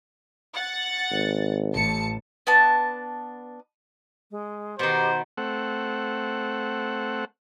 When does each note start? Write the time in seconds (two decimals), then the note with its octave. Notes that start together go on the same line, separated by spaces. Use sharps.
0.55 F#5 A6
1.11 G#1
1.73 A1 A5 C#7
2.47 B3 D4 A5
4.31 G#3
4.79 B2 D#3 G4 C5
5.38 A3 C4 F#5